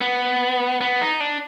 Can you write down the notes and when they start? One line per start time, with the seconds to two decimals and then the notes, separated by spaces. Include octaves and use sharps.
0.01 B3
0.81 B3
1.01 D#4
1.20 D4